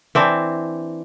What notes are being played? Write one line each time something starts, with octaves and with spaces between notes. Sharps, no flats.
E3 C4 D4